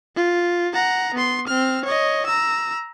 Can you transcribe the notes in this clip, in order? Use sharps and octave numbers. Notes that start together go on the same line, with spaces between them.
F4
F#5 A#5
B3 C6
C4 F6
C#5 D#5
A#5 E6